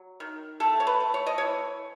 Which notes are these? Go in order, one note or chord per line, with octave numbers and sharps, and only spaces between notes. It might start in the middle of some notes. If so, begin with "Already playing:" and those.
Already playing: F#3
D#3
A3 A4
C#5
B4
A3
C#5
D#5
E3 C#5